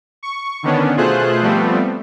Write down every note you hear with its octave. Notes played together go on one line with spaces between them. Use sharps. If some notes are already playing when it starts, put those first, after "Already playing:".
C#6
D3 D#3 B3 C#4 D4
B2 A3 F4 G#4 C5 F#6
F3 G3 A3 B3 C4